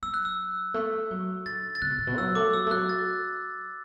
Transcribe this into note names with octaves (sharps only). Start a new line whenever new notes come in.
F#3 E6
F#6
E6
A3
F#3
D3 A6
A6
D3 F#6
B2
A2
B2
F#3 E6
A3 D6
F#3 E6
A3
F#3 F#6
A6